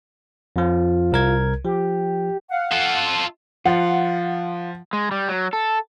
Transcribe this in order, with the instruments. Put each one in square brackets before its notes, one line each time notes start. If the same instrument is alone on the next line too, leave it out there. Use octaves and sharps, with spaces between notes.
[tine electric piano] F2 F3 [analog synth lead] F4
[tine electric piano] C2 A#4 G#6
[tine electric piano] F3 [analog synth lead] G4
[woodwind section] F5 F#5
[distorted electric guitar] F4 A4
[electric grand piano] F3 [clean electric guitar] F4 [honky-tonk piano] F#5
[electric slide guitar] G#3
G3
F#3
A4